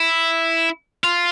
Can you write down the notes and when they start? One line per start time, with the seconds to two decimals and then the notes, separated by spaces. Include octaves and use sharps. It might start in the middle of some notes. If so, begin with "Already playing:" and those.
Already playing: E4
1.04 F4